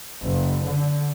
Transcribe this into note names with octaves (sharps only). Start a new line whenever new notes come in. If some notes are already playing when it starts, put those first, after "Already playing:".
F#1
D3